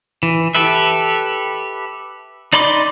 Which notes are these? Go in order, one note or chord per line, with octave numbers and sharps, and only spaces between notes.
E3
G4 A4 B4 E5
D#4 D5 B5 C6 D6